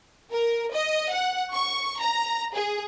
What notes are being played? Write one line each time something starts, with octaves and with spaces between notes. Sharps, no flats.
A#4
D#5
F#5
C#6
A#5
G#4